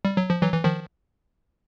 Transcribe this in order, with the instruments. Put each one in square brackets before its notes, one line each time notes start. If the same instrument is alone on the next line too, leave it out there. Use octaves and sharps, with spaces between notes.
[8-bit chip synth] G3
F#3
F3
E3 F#3
E3
D#3 F3